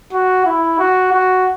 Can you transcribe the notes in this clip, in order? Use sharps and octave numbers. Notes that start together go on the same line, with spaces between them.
F#4
E4
F#4
F#4